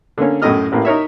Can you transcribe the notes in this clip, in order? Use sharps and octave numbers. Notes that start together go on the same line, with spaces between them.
D3 A#3 C#4
F#2 A2 A3 E4 D#5 F6
A1 A2 A#3
D#4 A#4 C#5 E5